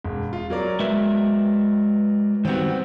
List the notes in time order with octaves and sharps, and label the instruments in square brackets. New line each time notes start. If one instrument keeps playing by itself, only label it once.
[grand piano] E1
F4
F#3 A#4 D5
[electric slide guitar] G#3 B4 E5
[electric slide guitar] D#3 G3 F#4 [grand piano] B3 C4